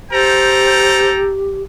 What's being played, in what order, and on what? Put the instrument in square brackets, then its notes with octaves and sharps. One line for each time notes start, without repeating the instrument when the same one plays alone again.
[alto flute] G4 [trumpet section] A4 G5 A#5 [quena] C5